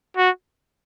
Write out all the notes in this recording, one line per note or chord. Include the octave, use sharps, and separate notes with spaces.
F#4